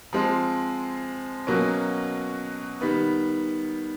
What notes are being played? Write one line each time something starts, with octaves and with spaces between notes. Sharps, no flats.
F3 G#3 C4
B2 F#3 A#3 C#4
D#3 G3 B3